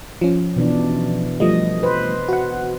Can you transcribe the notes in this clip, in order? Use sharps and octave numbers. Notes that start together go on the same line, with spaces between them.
F3 C#4
B2 E3 D4
F3 G3 A3 D#5
B4 C5
F#4 F#5